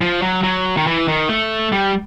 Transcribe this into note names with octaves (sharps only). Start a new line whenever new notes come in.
F3
F#3
F#3
D#3
E3
D#3
A3
G3